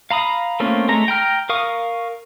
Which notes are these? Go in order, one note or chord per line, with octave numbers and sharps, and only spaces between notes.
F5 A#5 B5 D#6
A3 A#3 C4 C#4 F4
G#3 A3 A#5
G5 A#5 F6
A#4 F5 C#6 D#6